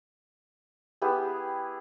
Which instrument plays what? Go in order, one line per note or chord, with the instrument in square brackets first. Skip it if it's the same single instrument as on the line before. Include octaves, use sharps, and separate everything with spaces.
[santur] B3 E4 G4 G#4